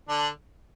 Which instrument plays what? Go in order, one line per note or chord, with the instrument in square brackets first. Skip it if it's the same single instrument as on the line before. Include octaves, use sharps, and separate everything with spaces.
[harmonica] D3 D4